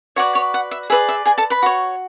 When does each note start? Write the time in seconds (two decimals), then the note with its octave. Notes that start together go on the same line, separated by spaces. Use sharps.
0.16 F#4 B4 C#5 D5 C#6
0.35 C#5 C#6
0.54 F#5
0.71 E5
0.90 G#4 B4 D5 E5
1.09 E5
1.26 G#4 G#5
1.38 A4 A5
1.50 B4 B5
1.62 F#4 C#5